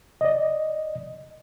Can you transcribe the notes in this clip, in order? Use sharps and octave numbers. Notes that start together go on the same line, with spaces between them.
D5 D#5